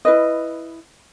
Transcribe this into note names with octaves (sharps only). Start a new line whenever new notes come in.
E4 B4 D#5